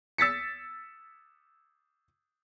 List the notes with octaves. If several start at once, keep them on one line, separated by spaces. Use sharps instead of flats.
E6 A6 B6 C#7